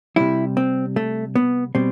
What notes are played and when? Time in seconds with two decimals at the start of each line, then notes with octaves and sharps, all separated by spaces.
0.16 C3 G3 E4
0.57 C4
0.96 A3
1.35 B3
1.75 B2 G3 C4